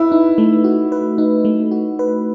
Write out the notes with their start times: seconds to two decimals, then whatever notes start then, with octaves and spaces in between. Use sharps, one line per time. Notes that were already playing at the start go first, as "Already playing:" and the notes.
Already playing: E4 B4
0.12 D#4
0.38 A3
0.64 F#4
0.92 B4
1.18 D#4
1.45 A3
1.71 F#4
1.99 B4